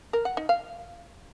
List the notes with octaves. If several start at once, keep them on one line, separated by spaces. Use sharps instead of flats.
A#4
F#5
D#4
F5